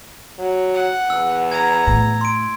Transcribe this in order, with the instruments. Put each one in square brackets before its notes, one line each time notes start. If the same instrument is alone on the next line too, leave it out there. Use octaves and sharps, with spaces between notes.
[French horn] F#3
[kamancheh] F#5
[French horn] E2 [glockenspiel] E6
[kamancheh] A#5 [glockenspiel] G#6
[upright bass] A2
[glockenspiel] C6 D7